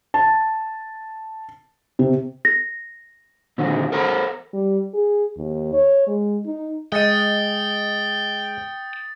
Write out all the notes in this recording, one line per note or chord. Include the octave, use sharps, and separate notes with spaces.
A5
C3
A#6
A#2 D3 D#3 C4 F#4
A4 A#4 C5 F#5 A#5 B5
G3
G#4
D#2
C#5
G#3
D#4
G#3 D#5 G5 D#6 A6 C#7